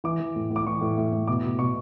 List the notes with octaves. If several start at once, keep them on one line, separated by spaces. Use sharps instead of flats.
E3 D6
E3
A2
A2
D6
E3 C#6
A2
A2
A2
B2 D6
B2
B2 C#6